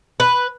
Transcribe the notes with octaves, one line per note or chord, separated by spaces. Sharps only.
B4